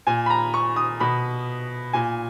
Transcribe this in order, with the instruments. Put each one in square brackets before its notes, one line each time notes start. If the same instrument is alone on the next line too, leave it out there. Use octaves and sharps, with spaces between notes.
[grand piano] A#2 G#5
B5
A#5
C#6
D#6
B2 B5
A#2 G#5